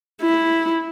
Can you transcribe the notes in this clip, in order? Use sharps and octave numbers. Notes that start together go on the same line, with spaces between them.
E4